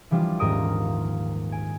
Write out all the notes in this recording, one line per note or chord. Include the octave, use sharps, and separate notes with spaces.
E3 F3 G3 D4 F4
D#1 G#2 A#4 D#6 D7
G#5 D7